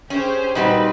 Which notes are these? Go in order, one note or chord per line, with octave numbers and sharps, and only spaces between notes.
C#4 G4 G#4 C5
A#2 G3 C4 D#4 F#4 B4